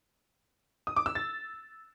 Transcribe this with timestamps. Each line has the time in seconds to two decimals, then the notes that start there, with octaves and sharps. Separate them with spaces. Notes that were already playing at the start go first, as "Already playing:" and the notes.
0.87 D#6
0.96 D6
1.06 E6
1.15 A6